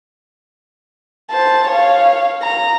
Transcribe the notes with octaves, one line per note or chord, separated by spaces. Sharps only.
C5 A5
C#5 F5
A#5